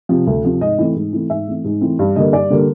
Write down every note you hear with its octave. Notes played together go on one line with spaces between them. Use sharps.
C3 F3
D2
C3 F3
G#2 D#5
E3 A3 C4
G#2
E3 A3 C4
G#2 E5
E3 A3 C4
G#2
E3 A3 C4
G2
D3 G3 A#3 D#5
G2 D5
D3 G3 A#3